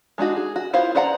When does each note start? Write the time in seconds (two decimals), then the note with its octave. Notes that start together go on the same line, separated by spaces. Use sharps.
0.18 G#3 D4 D#4 F#4
0.36 G#4
0.56 F#4
0.73 B3 E4 F4 C5 F5
0.95 B4 C5 D5 F#5 A#5